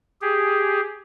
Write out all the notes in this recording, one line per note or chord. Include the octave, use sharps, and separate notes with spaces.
G4 G#4